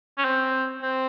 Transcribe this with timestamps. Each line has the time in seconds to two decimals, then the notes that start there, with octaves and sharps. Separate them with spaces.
0.18 C#4
0.25 C4
0.82 C4